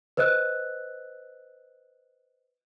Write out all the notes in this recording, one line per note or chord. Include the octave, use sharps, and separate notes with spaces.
B4 C5 D#5 E6 F#6